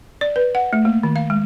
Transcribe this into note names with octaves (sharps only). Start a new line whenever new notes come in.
D5
B4
F#5
A3
A#3
D#3
F5
G#3